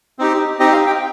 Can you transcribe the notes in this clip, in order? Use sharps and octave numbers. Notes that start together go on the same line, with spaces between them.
C4 D#4 G4
C4 D#4 G4 D#5
F5
G5